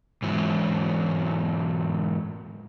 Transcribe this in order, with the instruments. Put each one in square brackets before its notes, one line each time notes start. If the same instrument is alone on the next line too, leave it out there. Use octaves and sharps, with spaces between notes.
[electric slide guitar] G#2 E3 F#3 G#3